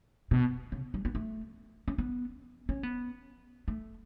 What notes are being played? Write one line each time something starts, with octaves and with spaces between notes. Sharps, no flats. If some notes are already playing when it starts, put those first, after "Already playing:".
B2
C#3
G3
B3
A3
C#4
B3
C#4
B3
A3